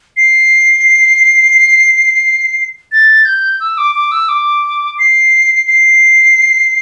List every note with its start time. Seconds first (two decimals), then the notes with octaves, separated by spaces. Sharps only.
0.17 C7
2.92 A6
3.25 G6
3.60 E6
3.77 D6
3.95 D6
4.11 E6
4.28 D6
4.98 C7
5.66 C7